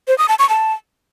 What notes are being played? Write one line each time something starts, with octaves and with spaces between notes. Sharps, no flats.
C5
D#6
A5
C#6
A5